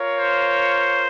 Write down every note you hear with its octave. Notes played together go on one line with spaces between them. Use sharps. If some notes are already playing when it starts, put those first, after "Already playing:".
Already playing: F4 A#4 C#5 F5
C5